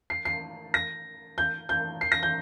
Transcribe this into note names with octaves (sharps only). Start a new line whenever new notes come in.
C7
C7
A#6
G6
G6
C7
A#6
G6